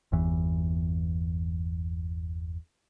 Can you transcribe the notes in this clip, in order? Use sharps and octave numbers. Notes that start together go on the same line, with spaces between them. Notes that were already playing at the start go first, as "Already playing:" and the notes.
G1 E2 E3